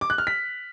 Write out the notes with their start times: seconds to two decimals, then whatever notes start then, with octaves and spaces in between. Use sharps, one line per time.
0.01 D6
0.10 F#6
0.18 F6
0.27 B6